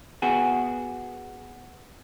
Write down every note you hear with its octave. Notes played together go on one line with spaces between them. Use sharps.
B3 F#4 G#4